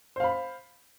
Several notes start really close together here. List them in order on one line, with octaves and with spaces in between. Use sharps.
C5 F5 B5